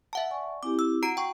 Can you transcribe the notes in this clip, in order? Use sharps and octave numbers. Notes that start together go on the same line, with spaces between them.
E5 F#5 A5
D5 G#5 C#6
C4 E4 G4 D6
E6
F#4 F#5 A#5 D7
G5 C#6